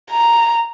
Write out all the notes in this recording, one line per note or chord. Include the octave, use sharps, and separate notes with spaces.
A#5